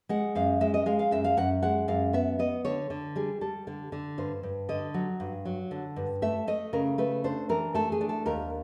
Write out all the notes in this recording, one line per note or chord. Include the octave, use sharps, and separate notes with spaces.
G#3 F#5
F#2 F5
G#3 E5
D#5
G#3 F5
F5
F#2 E5
F5
F#2 F#5
G#3 F#5
F#2 F5
B3 E5
B3 D#5
D3 C#5
D3
G3 G#4
G3 A4
D3
D3
G2 C5
G2
D3 D#5
F#3
G2
F#3
D3
G2
A3 E5
A3 D#5
C#3 A#4
A3 B4
D4 C5
E3 A#4
A3 A4
G#4
D4
A4
D#2 A#4